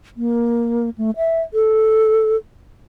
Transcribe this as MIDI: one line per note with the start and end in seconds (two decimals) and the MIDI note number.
0.17 0.90 58
0.98 1.11 57
1.17 1.41 76
1.54 2.36 69